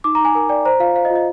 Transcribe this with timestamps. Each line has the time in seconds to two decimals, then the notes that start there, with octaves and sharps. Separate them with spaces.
0.04 D#4 D6
0.15 A#5
0.20 D#4 G#5
0.35 A#4 G#5
0.49 D5 G5
0.65 C5 A#5
0.80 F4 F5
0.95 C5 F5
1.05 D#5
1.10 F4
1.16 D#5